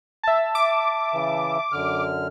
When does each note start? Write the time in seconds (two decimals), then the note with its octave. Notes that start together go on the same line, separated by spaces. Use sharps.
0.23 E5 A5
0.55 D6
1.14 C#3 E3
1.72 F#2 D3 F6